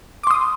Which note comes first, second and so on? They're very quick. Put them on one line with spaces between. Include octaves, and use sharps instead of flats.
D6 C6 D#6